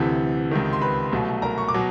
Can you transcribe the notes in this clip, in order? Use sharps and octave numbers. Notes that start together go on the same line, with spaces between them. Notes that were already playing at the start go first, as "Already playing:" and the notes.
Already playing: D2 C3 E3 A4
C#2 C3 D#3
C6
B4 B5
C2 B2 F#3 A3
A#4 A#5
C#6
D6
B2 F#3